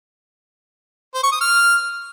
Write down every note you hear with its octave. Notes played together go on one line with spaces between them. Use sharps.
C5
C#6
D#6
F6